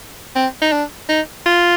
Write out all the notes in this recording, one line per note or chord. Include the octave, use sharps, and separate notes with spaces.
C4
D#4
D4
D#4
F4